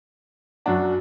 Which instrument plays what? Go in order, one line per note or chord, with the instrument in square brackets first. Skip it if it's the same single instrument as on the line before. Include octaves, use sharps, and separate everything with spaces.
[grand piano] F#2 F#3 D4 F#4